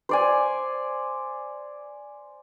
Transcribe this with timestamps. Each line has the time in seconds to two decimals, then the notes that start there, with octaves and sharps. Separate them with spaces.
0.09 C5 D5 G#5